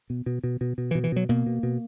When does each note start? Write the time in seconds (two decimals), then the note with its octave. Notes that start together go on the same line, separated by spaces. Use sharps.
0.10 B2
0.26 B2
0.44 B2
0.61 B2
0.78 B2
0.91 E3
0.95 B2
1.04 E3
1.12 B2 F#3
1.29 B2 A#3
1.46 B2
1.63 B2